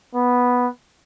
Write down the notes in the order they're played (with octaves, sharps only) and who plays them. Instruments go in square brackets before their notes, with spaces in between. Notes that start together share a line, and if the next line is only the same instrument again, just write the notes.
[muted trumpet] B3